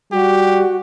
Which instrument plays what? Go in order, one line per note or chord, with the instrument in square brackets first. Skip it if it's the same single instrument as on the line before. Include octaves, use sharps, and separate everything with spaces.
[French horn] G3 [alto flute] F#4 [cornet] G4